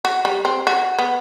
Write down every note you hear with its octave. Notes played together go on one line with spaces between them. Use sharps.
F#4
G3
C4
F#4
B3